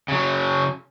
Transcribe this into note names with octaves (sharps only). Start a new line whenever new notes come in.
C#3 F#3